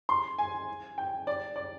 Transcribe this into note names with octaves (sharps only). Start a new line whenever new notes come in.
C6
G#5
G5
D5
D5